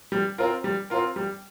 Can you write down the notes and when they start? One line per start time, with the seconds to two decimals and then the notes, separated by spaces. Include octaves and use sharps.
0.12 G3
0.38 C4 F4 A#4
0.64 G3
0.90 C4 F4 A#4
1.16 G3